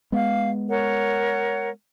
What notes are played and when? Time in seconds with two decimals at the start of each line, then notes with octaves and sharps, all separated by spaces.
0.12 G#3 B3 F5
0.69 A#4 C#5 F#5